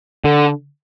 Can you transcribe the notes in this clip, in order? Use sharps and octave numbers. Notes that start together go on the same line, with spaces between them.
D3